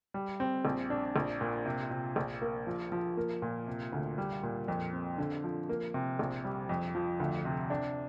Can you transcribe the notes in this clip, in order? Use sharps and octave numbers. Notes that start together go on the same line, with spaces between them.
G3
C4
A#1
D4
A#1
A#2
C3
C3
A#1
A#3
F3
F3
A#3
A#2
C3
D2
G3
A#2
F2
C4
D3
F3
A#3
C3
A#1
G3
F2
F3
D2
C3
D4